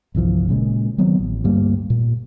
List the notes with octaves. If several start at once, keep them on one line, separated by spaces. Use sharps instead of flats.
G1 C2 E3 F3
A#2 C#3 G#3
D#3 F#3 B3 C4
A1
D2 G2 G3 A#3
A#2